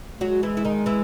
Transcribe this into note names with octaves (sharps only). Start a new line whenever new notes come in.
F#3 G#3 F#4
E3 E4
E4
D#3 D#4
E3 E4